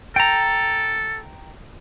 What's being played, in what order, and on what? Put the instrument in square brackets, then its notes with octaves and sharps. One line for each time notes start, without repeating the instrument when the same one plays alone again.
[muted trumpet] A4 [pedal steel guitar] G5 A#5